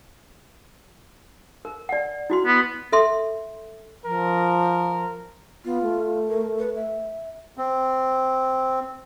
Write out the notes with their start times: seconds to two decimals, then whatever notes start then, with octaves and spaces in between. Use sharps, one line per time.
1.65 A#4
1.89 D5 F#5
2.30 E4 F#4 C6
2.46 B3
2.92 A4 E5 C6
4.06 F3 A#4
5.65 B3 F4
5.83 A3
6.29 A#4
6.58 B4
6.76 E5
7.57 C4